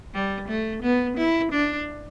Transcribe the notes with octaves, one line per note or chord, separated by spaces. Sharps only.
G3
A3
B3
E4
D4